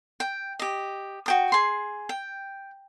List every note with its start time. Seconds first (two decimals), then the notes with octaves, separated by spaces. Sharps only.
0.20 G5
0.59 G4 D#5
1.26 F#4 G5 D#6
1.52 G#4 C6
2.09 G5